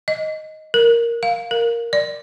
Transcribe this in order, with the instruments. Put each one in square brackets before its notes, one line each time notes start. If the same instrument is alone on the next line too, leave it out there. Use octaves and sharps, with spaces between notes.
[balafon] D#5
A#4
F5
A#4
D5